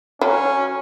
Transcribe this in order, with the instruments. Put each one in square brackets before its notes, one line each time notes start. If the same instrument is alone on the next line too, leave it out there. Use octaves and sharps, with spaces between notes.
[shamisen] F#3 [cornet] C#4